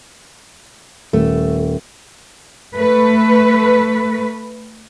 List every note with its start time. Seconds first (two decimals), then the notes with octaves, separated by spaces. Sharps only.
1.13 D#1 A3
2.76 A3 B4